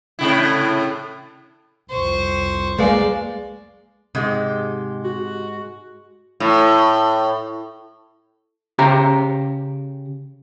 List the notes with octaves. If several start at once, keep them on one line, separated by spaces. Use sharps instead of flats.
A2 C3 E4
C2 F2 C5 C#6
G#3 A#3 B4 D5 F5 G#5
G#2 C3 G#3 G4
F#4
A2
C#3 G4 G5 A#5